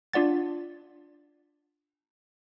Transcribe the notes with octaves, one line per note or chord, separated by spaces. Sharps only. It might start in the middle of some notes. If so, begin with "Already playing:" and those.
D4 F4 D5 F#5 A6